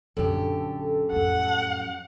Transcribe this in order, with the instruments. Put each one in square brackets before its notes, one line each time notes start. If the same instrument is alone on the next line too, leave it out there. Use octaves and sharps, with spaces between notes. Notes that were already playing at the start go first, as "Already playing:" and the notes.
[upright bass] A#1 D3 [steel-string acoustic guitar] F#2 G4 [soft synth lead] A4
[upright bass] F2 A2 [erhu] F#5